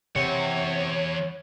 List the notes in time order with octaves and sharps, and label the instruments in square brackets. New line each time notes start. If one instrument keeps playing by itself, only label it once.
[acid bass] C3 [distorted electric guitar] E3 F#5 [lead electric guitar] C#5